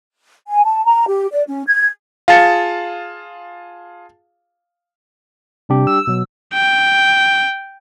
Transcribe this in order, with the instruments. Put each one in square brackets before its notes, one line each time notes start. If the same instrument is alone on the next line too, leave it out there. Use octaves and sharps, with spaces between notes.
[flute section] G#5
A5
A#5
G4
D5
C#4
G#6
[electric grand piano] F4 G#4 A5 [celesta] F5 A6 C#7
[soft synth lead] C3 [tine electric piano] G3 D4 G4
[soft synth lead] E6
[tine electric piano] B2 F#3
[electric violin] G5